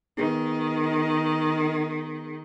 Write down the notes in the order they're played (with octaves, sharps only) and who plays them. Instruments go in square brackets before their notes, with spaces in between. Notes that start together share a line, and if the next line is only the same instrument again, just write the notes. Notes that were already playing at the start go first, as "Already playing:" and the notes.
[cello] D#3 [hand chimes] B3 G#4